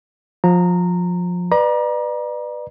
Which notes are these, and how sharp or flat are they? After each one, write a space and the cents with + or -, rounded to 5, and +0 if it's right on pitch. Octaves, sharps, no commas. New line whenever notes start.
F3 +25 A#5 -15
B4 +0 D5 +30 A#5 +35